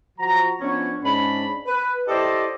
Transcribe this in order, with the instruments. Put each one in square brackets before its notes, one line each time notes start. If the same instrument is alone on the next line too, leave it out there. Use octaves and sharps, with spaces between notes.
[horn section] F3 F#4 A#5
F3 B3 C#4 D4 E4 C#5
G#2 C#4 D4 B5
B4
E4 G4 A4 C5 D5 D#5